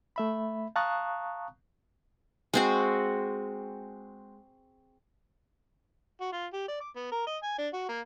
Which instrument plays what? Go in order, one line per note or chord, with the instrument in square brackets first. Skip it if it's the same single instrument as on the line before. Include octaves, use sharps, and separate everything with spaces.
[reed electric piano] A3 E5 B5
F5 A5 A#5 C#6 D#6 F#6
[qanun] G#3 C4 F#4
[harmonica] F#4
F4
G4
D5
D6
B3
A#4
D#5
G#5
D4
F#4
A#3